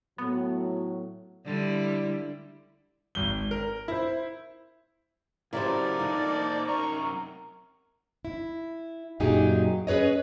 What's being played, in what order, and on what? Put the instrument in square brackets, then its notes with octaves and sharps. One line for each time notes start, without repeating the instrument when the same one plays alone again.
[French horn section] A2 F#3 [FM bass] B3
[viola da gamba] D3 G3 E4
[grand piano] G#1 G7
A#4
E4 C5
[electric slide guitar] C#3 F#3 A3 [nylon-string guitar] E4 G4 C5 [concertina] A#4 [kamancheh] D5
[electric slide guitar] D4 F4 A4 [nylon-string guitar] D#4
[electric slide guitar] A#3 C5 A5
[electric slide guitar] F#2 C3 A#5 [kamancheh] A#4 [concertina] C#6
[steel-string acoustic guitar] E4
F#2 A#2 F#3 D#4 G4 G#4
C#4 G#4 B4 C#5 D#5